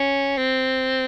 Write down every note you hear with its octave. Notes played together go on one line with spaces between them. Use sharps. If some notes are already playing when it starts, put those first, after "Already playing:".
Already playing: C#4
C4